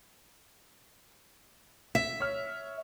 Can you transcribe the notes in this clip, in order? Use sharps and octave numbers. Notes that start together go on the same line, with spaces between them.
E5 B6
C#5 F6